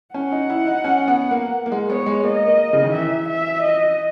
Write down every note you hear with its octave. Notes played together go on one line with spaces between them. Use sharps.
C#4 F#5
D#4
E4
D#4
C#4
B3
A#3
A#3
G#3
B3 C#5
G#3
A#3 D#5
A#3
C#3
D#3
E3 E5
E5
D#5